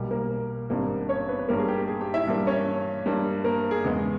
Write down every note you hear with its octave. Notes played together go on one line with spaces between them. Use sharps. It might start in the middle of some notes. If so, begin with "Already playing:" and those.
Already playing: B1 B2 G3 A#3
A#3 A#4
G#1 G2 G3 A#3
C#4 C#5
B3 B4
B4
G2 G3 A#3 A#4
G#4
G4
G#4
G4 G5
E4 E5
G2 G3 A#3
C#4 C#5
G2 G3 A#3
A#3 A#4
G#4
E2 C#3 G#3 B3